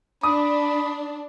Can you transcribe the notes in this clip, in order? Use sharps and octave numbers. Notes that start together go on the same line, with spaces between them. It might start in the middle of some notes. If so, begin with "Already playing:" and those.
D4 B5 D#6